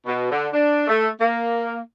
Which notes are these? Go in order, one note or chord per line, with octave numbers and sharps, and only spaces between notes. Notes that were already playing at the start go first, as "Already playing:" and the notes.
B2
D3
D4
A3
A#3